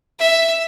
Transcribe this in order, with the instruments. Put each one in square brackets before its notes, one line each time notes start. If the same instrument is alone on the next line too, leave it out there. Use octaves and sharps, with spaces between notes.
[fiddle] E5